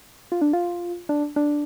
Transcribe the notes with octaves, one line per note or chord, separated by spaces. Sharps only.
F4
D4
F4
D4
D4